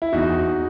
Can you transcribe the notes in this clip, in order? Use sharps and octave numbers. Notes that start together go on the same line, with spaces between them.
E4
E2 D#4 F#4
E2